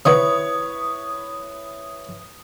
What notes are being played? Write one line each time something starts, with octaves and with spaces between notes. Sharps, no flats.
C3 D#3 B3 E4 B4 C#5 D#6